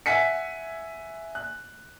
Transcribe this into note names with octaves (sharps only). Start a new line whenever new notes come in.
E5 F#5 G#5 B6 C#7
F#6